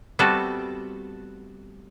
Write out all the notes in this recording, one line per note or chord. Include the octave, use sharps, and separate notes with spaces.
G3 A3 B3 C4 F#4 A4